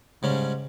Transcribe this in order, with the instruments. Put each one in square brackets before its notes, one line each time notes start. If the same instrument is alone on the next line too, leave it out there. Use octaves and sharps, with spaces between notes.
[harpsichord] G#2 G3 C#4 [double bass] C#3